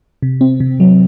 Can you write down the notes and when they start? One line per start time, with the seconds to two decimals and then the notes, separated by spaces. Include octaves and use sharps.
0.22 C3
0.41 C4
0.60 C3
0.80 F#3